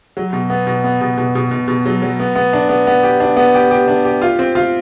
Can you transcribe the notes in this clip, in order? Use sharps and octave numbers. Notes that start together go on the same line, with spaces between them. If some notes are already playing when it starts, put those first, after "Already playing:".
F#3
B2
B3
B2
B3
B2
B2
B2
B2
B2
F#3
F#3
B3
B3
D4
B3
B3
G4
D4
B3
G4
G4
D4
G4
F4
C4
F4